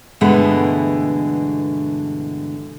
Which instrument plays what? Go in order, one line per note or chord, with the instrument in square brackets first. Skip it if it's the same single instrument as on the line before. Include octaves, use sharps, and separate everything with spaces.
[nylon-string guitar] G2 B2 D3 E3 G#3 A3